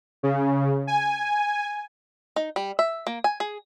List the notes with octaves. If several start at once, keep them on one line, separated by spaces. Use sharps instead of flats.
C#3
G#5
D#4
G3
E5
A#3
G#5
G#4